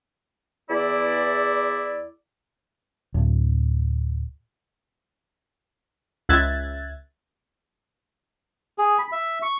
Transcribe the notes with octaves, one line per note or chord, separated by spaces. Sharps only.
E2 E4 D5
D1
C#2 E5 F#6 G#6 A6
G#4
B5
E5
C#6